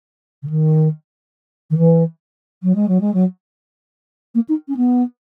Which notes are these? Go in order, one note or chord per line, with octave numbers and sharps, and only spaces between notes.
C#3
D#3
D#3
E3
F#3
G#3
F#3
G#3
F#3
A#3
D#4
C#4
B3